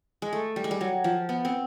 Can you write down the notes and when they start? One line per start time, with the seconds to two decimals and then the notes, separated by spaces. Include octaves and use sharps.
0.22 G#3
0.33 A3
0.56 G3
0.64 G#3
0.71 G3
0.81 F#3
1.04 F3
1.29 B3
1.45 C4